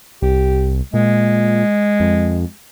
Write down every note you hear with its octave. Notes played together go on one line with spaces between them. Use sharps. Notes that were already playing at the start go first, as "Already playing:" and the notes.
C2 G4
A#2 G#3
F2